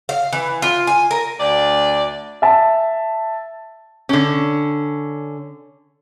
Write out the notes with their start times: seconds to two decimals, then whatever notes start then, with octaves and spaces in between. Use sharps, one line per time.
0.09 F5
0.33 E3
0.62 F4
0.87 G#5
1.11 A#4
1.39 D2 D5
2.42 E5 A5
4.09 D3 C#4